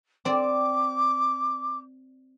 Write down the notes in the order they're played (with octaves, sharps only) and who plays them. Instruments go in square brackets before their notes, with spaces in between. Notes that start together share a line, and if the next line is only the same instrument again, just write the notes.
[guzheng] C4 D5 [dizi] D6